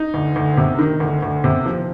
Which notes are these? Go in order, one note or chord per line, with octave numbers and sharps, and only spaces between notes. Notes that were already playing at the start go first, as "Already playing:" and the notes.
Already playing: D#4
D2
D2
C3
D#3
D2
D2
C3
F3